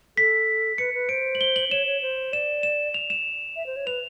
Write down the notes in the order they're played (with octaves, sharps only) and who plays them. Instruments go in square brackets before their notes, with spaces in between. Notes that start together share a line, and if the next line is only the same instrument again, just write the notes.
[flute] A4 [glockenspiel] B6
[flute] B4 [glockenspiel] C#7
[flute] B4
[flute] C5 [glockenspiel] D7
[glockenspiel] F#7
G7
F#7
[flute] C#5 [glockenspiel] E7
[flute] C#5
C5
[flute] D5 [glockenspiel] E7
[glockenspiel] E7
F7
E7
[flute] E5
C5
C#5
[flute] B4 [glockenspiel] F7